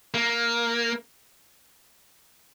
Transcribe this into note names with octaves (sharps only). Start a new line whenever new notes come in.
A#3